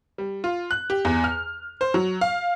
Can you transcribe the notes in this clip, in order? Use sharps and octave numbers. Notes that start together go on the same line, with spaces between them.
G3
F4
F#6
G4
E2
F6
C5
F#3
F5